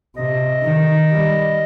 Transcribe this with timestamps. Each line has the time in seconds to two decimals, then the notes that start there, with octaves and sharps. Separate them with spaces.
0.16 C3 D#5
0.64 D#3
1.10 G3